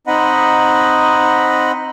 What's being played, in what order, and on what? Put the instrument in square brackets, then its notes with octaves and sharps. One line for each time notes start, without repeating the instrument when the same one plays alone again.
[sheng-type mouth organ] C4 D#4 D#5 F#5 B5